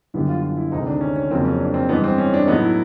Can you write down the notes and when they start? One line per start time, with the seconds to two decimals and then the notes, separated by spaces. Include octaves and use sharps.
0.14 F#2 D3 G3 B3 E4
0.29 F4
0.43 F4
0.57 E4
0.72 D2 C3 D#3 G#3 D#4
0.86 D4
1.01 C#4
1.16 C#4
1.31 F2 C#3 F#3 A#3 C4
1.45 C#4
1.60 D4
1.74 C4
1.89 G2 E3 G#3 B3
2.04 C4
2.18 C#4
2.34 D4
2.47 A2 F#3 B3 D#4
2.62 E4